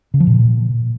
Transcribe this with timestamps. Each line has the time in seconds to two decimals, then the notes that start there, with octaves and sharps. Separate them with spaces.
0.14 C#3
0.20 F3
0.27 A#2